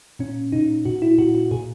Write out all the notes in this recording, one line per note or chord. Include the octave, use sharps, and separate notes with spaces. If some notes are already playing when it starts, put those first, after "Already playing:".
A#2 C#4
A#2 D#4
A#2 F#4
E4
A#2 F#4
F#4
A#2 G#4